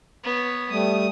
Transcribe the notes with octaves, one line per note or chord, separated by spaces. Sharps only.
B3 C#5
G3 A3 D#6